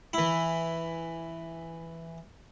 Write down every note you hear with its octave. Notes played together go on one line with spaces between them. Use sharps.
E3 E4